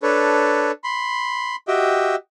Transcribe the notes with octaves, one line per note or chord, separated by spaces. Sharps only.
D4 A4 B4 C#5
B5 C6
F#4 G4 D#5 E5 G5